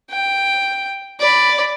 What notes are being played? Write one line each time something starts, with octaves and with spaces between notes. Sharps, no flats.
G5
D5 B5